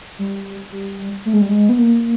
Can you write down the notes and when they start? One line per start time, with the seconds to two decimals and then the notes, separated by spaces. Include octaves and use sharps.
0.19 G3
0.72 G3
1.25 A3
1.33 G#3
1.42 G3
1.49 G#3
1.69 B3
1.78 A#3